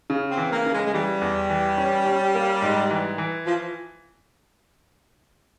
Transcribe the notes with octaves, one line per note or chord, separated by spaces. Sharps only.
C#3
C4
E3
A#3
C#3
G#3
G#3
E3 G3
E2
E3
C#4
C#4
A#3
G#2
E3
E3
F3